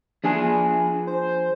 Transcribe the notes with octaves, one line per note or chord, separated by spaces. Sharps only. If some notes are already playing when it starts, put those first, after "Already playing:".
F3 D4 G#4 G#5
C5